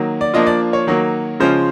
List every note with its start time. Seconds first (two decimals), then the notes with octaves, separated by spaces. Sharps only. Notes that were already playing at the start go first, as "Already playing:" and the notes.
Already playing: D#3 F#3 A#3
0.21 D5
0.34 F3 A#3 D4 F4 D#5
0.47 D5
0.73 C#5
0.87 D#3 F#3 A#3
1.40 C#3 F3 G#3 C#4 F4 C5